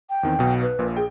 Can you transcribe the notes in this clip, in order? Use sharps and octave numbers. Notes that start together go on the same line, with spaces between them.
G5
E2 D#3 C4
B1 B2
B4
A#1 A#2
G#4 G5